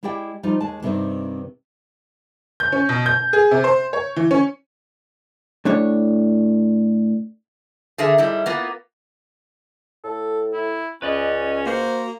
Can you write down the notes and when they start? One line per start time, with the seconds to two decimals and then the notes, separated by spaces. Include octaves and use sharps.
0.03 G#3 E4 G4 D5 G5
0.43 F3 G3 D#4 F4
0.61 D#2 G#3 A5
0.82 G2 C3 D#3 G3 C4 D#4
2.60 G6
2.72 C#4
2.89 B2
3.06 G6
3.33 G#4
3.51 C3
3.64 C5
3.93 C#5
4.16 E3
4.31 C#4
5.65 A2 D4 C#5
7.98 D3 G#4 A#4 E5
8.18 G#2 G3 E4
8.46 A#3 B3 F4
10.04 A2 A4
10.53 E4
11.02 C#2 C#4 B4 D5 D#5
11.66 A#3 F#4 C5